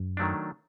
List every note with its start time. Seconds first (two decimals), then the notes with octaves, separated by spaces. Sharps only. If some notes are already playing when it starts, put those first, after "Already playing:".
Already playing: F#2
0.17 D#3 F#3 A3 D4